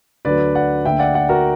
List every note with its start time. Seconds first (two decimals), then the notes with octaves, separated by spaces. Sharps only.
0.25 D2 D3 F#3 B4 D5
0.55 D5 F#5
0.85 D2 D3 A#3 E5 G5
0.99 D5 F#5
1.14 D5 F#5
1.29 F#4 A#4